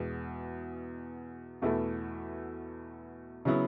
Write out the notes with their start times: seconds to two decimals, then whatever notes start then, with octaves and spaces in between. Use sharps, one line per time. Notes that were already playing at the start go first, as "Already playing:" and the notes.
Already playing: E2 B2 G#3
1.62 E2 B2 A3 E4 A4
3.45 C#3 F#3 B3 E4